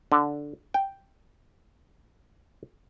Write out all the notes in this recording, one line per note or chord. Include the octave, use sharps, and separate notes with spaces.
D3
G5